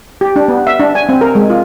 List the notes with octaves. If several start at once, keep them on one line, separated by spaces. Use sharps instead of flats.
G4
D4
B3
E5
D4
G#5
C4
A#4
G#3
F4